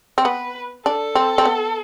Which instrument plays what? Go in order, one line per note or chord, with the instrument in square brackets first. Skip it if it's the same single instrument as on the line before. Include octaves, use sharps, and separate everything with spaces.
[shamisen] C4
[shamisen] B3 [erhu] B4
[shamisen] D4 [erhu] A4
[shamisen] C4
C4
B3